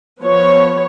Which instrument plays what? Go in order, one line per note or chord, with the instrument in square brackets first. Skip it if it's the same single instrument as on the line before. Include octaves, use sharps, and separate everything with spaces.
[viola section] F3 B3 C#5